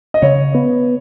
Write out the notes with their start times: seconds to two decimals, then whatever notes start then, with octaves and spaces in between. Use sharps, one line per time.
0.14 D#5
0.22 C#3 C#5
0.55 B3